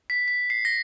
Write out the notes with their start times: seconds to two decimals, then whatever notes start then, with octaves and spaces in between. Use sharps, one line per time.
0.10 B6
0.28 B6
0.50 C7
0.65 A#6